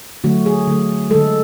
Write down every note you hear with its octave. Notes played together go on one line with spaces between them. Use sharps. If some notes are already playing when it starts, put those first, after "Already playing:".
D3 F#3 A3 F#4
G#4
D3 F#3 A3
D3 G#3 A4